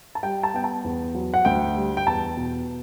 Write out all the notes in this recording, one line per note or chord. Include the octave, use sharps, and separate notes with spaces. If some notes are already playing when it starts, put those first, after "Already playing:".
A5
G3 G5
A5
B3 G5
A5
E2
F#3
F#5
D2 G5
G3
G5
E2 A5
B2